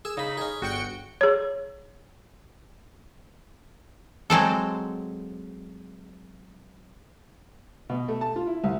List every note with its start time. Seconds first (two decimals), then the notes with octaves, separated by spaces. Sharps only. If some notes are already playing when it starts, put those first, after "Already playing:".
0.05 G#4 E6
0.17 C#3 D#4 B5
0.37 C#4 G#4
0.62 G1 F#4 G5 C#7
1.21 G#4 C#5
4.30 F#3 G#3 C4 A4
7.89 B2
8.08 A3
8.21 A5
8.36 F4
8.47 E4
8.64 C2